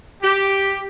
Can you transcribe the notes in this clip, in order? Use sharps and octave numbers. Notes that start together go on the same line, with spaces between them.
G4